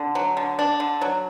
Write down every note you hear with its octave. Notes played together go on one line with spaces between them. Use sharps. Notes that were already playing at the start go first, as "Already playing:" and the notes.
Already playing: D3
F#3
D3
D4
D3
F#3